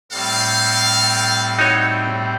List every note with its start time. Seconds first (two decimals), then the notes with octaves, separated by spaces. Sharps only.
0.12 A2 G3 C4 A4 F5
1.59 D#4 F#4 C#5